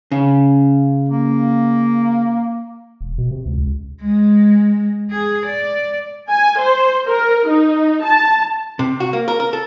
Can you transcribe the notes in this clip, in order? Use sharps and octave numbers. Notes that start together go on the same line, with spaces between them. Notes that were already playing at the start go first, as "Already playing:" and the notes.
C#3
A#3
E1
B2
C3
C#2
C#2
G#3
G#4
D5
G#5
C5
A#4
D#4
A5
C3
F#4
A#3
A#4
A#4
A4